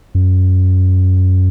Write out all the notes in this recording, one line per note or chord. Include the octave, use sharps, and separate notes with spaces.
F#2